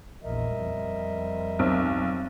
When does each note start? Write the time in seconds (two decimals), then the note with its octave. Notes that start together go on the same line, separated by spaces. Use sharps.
0.24 A#1 E2 A#4 D#5 E5
0.57 F2 G3
1.59 B1 C4